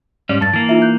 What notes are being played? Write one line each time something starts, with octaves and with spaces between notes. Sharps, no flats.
G#2 G3 C#4 D5
G2 A5 A6
E3 A#3
D#4 F4 E5
F#6 G6